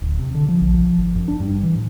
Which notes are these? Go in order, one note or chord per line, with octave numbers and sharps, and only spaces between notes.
D1
C3
D3
F3
A#1
F3
G#1
F#2
D4
G2
E3
A2